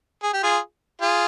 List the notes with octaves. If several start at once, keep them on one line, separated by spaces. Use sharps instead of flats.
G#4
G4
F4 G#4
F4 G#4